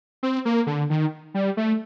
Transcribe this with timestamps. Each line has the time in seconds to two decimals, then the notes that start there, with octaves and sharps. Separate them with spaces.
0.23 C4
0.45 A#3
0.67 D3
0.90 D#3
1.34 G3
1.57 A3